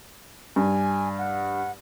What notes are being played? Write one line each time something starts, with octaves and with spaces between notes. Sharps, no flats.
G2 G#5
F#5